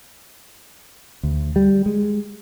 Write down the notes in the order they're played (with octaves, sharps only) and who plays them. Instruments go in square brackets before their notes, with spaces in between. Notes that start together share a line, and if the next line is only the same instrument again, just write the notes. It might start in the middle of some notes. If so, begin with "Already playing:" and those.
[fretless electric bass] D2
G3
G#3